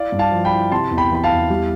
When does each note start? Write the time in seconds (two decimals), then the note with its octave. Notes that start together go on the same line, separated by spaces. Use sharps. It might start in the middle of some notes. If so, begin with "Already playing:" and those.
Already playing: E4 D5 F5
0.12 G2
0.19 F5 A5
0.32 F3
0.45 G5 B5
0.52 E4
0.71 C3 A5 C6
0.91 E2
0.97 G5 B5
1.11 E3 B5
1.24 F5 A5
1.30 E2
1.50 G3